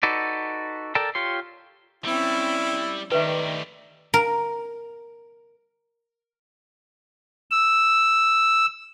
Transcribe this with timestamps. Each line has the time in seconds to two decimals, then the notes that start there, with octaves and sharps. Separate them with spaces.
0.03 D#4 F#4 A4 B4 D5
0.95 A4 A#4 D5 G5 A5
1.15 F4 G4 C#5 C6
2.04 G3 C4 C#4 E4
3.12 D#3 A3 G4 B4 D5 E5
4.14 A#4
7.51 E6